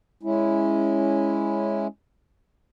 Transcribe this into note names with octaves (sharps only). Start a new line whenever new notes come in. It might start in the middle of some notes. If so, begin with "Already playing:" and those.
G#3 C#4 E4